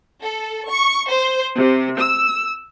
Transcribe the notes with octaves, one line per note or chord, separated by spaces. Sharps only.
A4
C#6
C5
C3
E6